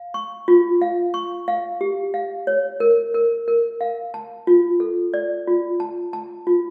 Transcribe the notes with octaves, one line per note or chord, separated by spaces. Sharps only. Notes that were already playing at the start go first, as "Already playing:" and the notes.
Already playing: F5
C#6
F4
F5
C#6
F5
G4
F5
C#5
A#4
A#4
A#4
F5
A5
F4
A4
D5
F4
A5
A5
F4